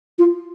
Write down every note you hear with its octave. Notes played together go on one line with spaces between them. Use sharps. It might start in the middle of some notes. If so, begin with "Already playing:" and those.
F4